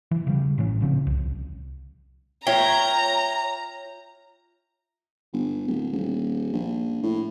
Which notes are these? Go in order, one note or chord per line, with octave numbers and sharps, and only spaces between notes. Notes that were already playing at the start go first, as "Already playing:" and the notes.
E3
C#3 G3
A1 A2 E3 C#4
A#2 C#3 F3 C4
C2
F4 C#5 E5 G5 A#5
G1
D1
D#1
A#1
A2